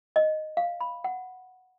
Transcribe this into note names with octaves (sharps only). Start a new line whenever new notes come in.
D#5
F5
B5
F#5